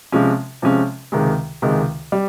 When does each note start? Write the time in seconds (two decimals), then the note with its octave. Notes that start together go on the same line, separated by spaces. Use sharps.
0.12 C3 F3 G#3 C#4
0.62 C3 F3 G#3 C#4
1.12 C#2 C3 D#3 G#3
1.62 C#2 C3 D#3 G#3
2.12 G3